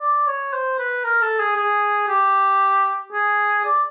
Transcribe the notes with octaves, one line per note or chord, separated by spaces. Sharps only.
D5
C#5
C5
B4
A#4
A4
G#4
G#4
G4
G#4
D5